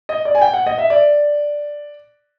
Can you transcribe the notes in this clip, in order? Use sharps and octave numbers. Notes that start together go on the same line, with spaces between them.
D#5
D5
G#5
G5
F#5
D#5
E5
D5